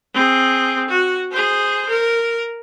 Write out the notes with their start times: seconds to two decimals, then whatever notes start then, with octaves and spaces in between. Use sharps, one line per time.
0.14 C4 G#4
0.89 F#4
1.31 G#4 C5
1.89 A#4